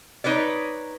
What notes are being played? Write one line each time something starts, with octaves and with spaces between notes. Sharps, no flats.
D#4 B4 C#5 D5